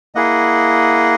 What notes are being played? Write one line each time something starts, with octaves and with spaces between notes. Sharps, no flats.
A#3 E4 G#4 D#5 F#5